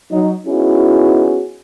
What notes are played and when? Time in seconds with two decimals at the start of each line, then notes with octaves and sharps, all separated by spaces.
0.11 F#3 D#4 D#5
0.47 B3 C#4 D#4 E4 F#4 G#4